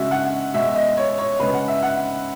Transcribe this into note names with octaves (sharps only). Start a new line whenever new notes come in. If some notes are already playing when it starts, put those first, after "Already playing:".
Already playing: C#3 G#3 F#4 E5
F#5
B2 G#3 E5
D#5
C#5
C#5
C#3 G#3 B4
F#5
E5
F#5